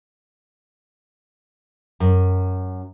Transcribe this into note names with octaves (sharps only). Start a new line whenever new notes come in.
F#2